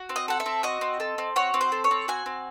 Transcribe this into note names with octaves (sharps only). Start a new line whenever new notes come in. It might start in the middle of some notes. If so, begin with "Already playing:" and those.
Already playing: F#4
C4
D#5
A4 F#5
E5
C4
F#4 D#5
C4
A4
C4
F#4 C#5
C4
C5
A4
C#5
C4
F#4 G#5
C4